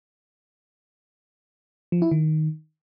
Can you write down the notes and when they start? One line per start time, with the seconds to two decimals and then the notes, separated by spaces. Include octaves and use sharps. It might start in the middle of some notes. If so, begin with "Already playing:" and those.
1.92 F3
2.02 E4
2.11 D#3